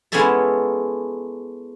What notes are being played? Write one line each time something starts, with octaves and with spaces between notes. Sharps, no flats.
G#3 B3 C#4 E4 A4 E5